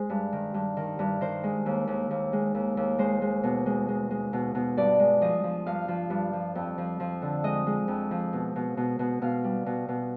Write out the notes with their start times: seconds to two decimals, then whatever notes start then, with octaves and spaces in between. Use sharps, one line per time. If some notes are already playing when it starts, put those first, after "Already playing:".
Already playing: G#3 C5
0.10 G2
0.33 D#3
0.54 G2
0.77 D#3
0.99 G2
1.21 D#3 C5
1.44 G#3
1.66 D#2
1.87 D#2
2.10 D#2
2.33 G#3
2.54 D#2
2.77 D#2
2.99 G#3 C5
3.22 G#3
3.43 B2
3.66 G#3
3.88 G#3
4.11 G#3
4.33 B2
4.55 B2
4.77 G2 D5
4.99 G#3
5.21 F3 D#5
5.44 F3
5.66 G2 F5
5.88 F3
6.10 G2
6.33 F3
6.55 F2
6.78 F3
7.00 F3
7.22 D3
7.44 G#3 D#5
7.67 G#3
7.88 F2
8.11 F3
8.33 B2
8.56 B2
8.77 B2
8.99 B2
9.22 B2 F5
9.44 G3
9.66 B2
9.89 B2